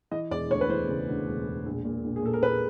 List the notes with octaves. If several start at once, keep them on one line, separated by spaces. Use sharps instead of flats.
E3 D#5
E1 D5
D2 C#5
B4
E3 C5
C#3
D2
E1
E1
A#1
A#2
A#1
G#4
A#2 A4
A#4
A#1 B4